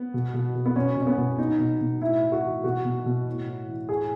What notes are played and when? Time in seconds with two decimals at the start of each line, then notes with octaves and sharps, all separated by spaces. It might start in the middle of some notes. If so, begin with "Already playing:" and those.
Already playing: B3
0.14 B2
0.34 B2
0.55 B2
0.66 B3
0.76 B2 C#4
0.97 B2 C#4
1.07 B3
1.18 B2
1.38 B2 D#4
1.59 B2
1.81 B2
2.02 A2 E4
2.23 A2
2.32 F#4
2.43 E3
2.64 B2 F#4
2.85 B2
3.06 B2
3.27 A2
3.47 A2
3.68 E3
3.89 A2 G#4